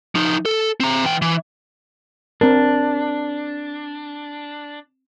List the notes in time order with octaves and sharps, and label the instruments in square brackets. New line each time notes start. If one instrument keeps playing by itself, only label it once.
[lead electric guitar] F3 D#4
A4
C4 A#5
E3 G5
E3
[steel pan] C4 A#4 [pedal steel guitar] D4